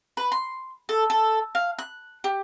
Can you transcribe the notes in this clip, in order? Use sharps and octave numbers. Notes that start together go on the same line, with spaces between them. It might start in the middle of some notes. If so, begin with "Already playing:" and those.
B4
C6
A4
A4
F5
F#6
G4